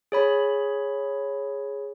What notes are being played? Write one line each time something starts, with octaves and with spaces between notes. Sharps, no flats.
G#4 C#5 B5